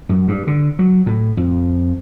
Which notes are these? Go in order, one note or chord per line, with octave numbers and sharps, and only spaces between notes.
F#2
G2
D3
F#3
A2
F2